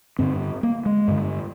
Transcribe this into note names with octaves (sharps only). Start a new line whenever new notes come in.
G2 D3 C4
A#3
G#3
G2 D3